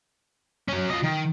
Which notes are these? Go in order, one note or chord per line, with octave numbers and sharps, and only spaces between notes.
F#3 C#4
F4 D#5
D#3